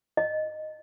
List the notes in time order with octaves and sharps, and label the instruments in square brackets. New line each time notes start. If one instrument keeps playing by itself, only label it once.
[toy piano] D#5